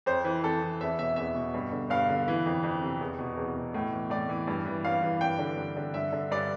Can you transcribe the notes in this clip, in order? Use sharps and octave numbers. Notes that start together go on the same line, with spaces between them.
F2 C5
E3
F2 A4
E3
E2 E5
B2 E5
E2 E5
B2
G2
D3
G2 F5
D3
E3
F2
F2
C3
E2
B2
E2
B2
A2
E3
A2 D5
E3
G2
E3
G2 F5
E3
G2 G5
D3
G2
D3
G2 E5
D3
G2 D5